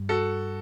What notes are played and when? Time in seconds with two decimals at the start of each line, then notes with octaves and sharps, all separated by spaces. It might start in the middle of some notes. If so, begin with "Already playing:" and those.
Already playing: G2
0.09 F#4 A4